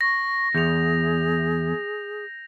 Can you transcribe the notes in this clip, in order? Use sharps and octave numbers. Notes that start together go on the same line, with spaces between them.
C#6 A#6
E2 G#4 G6 F7